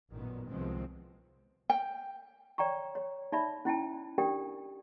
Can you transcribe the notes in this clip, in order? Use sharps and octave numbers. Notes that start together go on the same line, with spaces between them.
A1 F#2 A#2 D#3 B3
C2 D#3 F3 G#3 B3 C4
G5
C#5 D5 G5 A#5 C#6
C#5
D#4 D5 E5 B5
C#4 E4 G5 A5
D4 G4 A#4 D5 G5